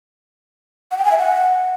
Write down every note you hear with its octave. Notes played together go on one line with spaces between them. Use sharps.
F#5
G5
G#5
E5
F#5